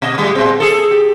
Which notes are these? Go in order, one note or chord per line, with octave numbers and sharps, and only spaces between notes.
B2 D#5
A2 G3 G#3
A#2 C4
G#4 A4
G4